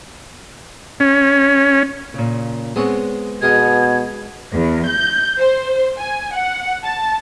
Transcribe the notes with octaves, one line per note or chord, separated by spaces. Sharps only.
C#4
A#2 C#3
G#3 B3 C4 G#4 C#5 F#5
B2 G#4 A#4 D#5 G#6
E2
G6
C5
G#5
F#5
A5